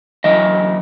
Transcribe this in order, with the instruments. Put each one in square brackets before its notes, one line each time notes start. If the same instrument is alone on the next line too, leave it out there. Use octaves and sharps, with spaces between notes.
[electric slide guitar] F#2 E3 D#5